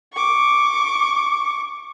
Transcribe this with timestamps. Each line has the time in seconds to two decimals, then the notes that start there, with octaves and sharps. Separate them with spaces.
0.13 C#6 D6